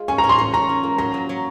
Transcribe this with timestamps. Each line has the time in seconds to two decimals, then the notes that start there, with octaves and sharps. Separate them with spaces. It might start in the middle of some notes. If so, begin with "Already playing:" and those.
Already playing: G#3 F4
0.08 C#4 G#5
0.18 A#5
0.24 C#4
0.29 C6
0.38 C#4
0.54 C#4 A#5
0.69 C#4
0.83 A#3
0.98 F#3 A#5
1.14 F#3
1.29 F#3